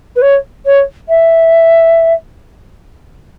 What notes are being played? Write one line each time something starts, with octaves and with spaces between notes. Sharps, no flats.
B4
C#5
C#5
E5